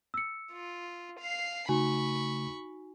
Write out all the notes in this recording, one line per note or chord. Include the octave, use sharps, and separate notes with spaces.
E6 C#7
F4
F5 C7
C#3 A3 D#4 F#4 G#5 B5 C#6